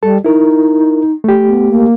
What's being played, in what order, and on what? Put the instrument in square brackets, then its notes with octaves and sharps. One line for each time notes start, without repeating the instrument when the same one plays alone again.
[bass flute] G3 [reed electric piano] A4 A5
[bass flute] D#4 [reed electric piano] E4 A#4
[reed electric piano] A3 G4
[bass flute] B3
A#3